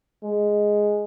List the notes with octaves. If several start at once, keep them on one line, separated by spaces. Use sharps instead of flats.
G#3